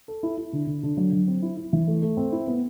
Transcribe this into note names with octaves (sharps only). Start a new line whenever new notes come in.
A4
E4
E4
D3
D3
D3
F#3
F#3
C4
E4
E4
E3
A3
A3
C4
E4
B3